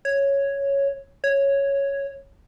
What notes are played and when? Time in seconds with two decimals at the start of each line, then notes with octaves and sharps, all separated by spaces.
0.05 C#5
1.24 C#5